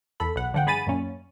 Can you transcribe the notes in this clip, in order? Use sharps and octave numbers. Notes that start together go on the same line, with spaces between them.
E2 A4 B5
B1 F#5
A1 D3 F3 F#5 G5
G2 G#4 B5 A6 D#7
F#2 A#2 C#4